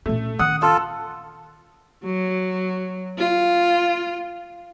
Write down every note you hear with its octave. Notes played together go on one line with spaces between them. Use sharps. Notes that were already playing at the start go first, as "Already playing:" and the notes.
A#2 A3 C#4
D#3 C#4 F#5 D#6
F4 A4 E6
F#3
F4